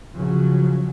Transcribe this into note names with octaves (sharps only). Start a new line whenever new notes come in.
C#3 F3 F#3